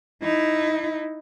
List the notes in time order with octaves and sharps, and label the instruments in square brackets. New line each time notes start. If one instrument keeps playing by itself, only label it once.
[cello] D#4 E4